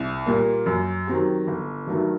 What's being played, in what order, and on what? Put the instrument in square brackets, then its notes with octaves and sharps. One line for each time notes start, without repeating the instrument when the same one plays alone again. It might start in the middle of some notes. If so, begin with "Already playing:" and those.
Already playing: [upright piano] C2
A#2 G3 A#3
F#2
D#3 F#3 C4 G4
G1
G2 D#3 F#3 A3